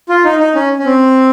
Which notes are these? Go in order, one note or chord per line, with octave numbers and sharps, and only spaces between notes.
F4
D#4
D#4
C#4
C#4
C4